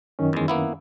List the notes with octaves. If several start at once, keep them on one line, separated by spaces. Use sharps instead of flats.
F#2 D#3 C#4
E2 G#3
A#3 B3 E4